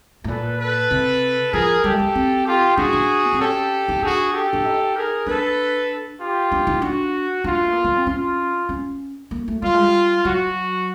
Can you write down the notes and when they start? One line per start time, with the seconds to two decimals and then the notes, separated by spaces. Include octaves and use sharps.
0.24 A2
0.28 A#2 A4 B4
0.59 A4 B4
0.91 C3
1.53 F3 G#4 A#4
1.84 G3 G4 A4
1.92 G#3
1.99 G3
2.15 C4
2.46 F4 G4
2.77 D4 F#4 G#4
2.93 D4
3.26 B3
3.33 C4
3.40 C#4 G4 A4
3.88 D#4
4.02 D4 F#4 G#4
4.33 G4 A4
4.53 D4
4.65 D#4
4.96 G#4 A#4
5.26 D4 A4 B4
6.20 F4 G4
6.52 D4
6.67 D#4
6.82 D4 F#4
7.44 D4 F4
7.61 A3
7.72 A#3
7.84 B3
7.96 C4
8.07 C#4 F4
8.69 C#4
9.31 A#3
9.48 A3
9.62 G3 F4
9.74 G#3
9.84 G3
10.25 F#3 F#4